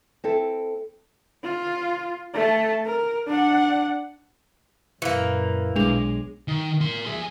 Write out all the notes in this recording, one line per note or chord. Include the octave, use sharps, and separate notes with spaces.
C4 E4 A4
F4
A3 A5
A#4
D4 F#5
F#2 A#2 E3 A#3
B1 G#3 D4 G#4 D6 F7
D#3
A#4 C6
G#4 E5